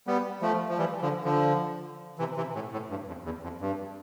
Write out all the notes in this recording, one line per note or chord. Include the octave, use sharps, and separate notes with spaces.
G3 B3
F3 A3
F3
E3 G3
D3 F3
D3 F3
C3 E3
C3 E3
A2
A2
G2
F2
E2
F2
G2